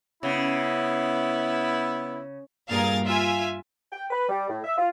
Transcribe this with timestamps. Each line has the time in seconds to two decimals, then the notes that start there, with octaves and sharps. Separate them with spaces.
0.23 C#3 B3 E4
2.69 G2 A#2 G#4 A#4 F5 A6
3.04 F4 E5 G#5
3.92 G5
4.11 B4
4.29 G3
4.49 A2
4.64 E5
4.78 F4